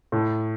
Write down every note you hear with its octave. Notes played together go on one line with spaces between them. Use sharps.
A2